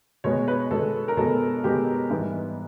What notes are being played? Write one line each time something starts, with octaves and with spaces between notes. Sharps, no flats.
B2 G#3 B3 C#5
B4
B2 G#3 B3 A4
A#4
B2 G#3 B3 A4
B2 G#3 B3 G4
G#2 E3 G3 B3